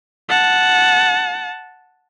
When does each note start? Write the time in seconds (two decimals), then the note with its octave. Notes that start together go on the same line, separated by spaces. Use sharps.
0.29 F#5 A5